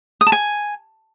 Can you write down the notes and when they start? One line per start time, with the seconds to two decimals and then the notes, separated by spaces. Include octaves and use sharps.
0.21 D#6
0.27 A5
0.32 G#5